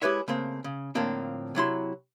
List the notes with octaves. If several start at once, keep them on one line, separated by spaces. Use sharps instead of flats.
G#3 E4 G4 B4 C#5 E5
C#3 A3 A#3 C4
C#3
A2 D3 F3 A#3 C4 D4
C3 F#3 E4 C6